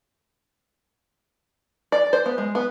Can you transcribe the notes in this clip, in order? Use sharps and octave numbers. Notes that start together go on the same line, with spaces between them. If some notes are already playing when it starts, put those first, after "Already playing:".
D5
C5
B3
G#3
B3